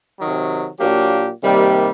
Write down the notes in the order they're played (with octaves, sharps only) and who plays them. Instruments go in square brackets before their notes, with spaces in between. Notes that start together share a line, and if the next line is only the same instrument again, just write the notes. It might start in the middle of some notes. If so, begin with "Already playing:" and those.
[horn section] C3 D#3 F#3
A#2 F#3 A#3 D4 G4
C3 D#3 G3 A#3